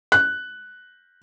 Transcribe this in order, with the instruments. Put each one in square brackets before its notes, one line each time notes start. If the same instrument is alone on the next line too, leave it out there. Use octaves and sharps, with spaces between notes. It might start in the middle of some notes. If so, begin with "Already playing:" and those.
[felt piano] F#6